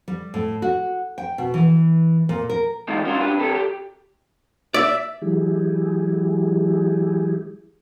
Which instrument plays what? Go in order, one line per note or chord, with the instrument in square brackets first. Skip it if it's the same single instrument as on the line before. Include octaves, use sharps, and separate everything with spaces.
[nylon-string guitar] G3
A2
F#4
G5
B2
E3
A#2
A#4
[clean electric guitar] E3 G#3 D#4 F4 G4
C#4 D4 F4 F#4
D4 G4 B4
C3 G4 A4
G4
[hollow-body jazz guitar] D5 [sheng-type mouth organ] E5
[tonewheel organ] E3 F#3 G#3 E4 G4 G#4